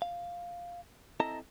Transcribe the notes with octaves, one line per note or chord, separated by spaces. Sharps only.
F5
C4 E4 A4 D#5 A5 A#5